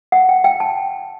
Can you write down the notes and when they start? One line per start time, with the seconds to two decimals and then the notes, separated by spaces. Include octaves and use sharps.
0.12 F#5
0.29 G5
0.44 G5
0.60 A5